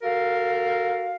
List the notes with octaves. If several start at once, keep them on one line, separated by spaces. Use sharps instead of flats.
F#4 A4 A#4 F5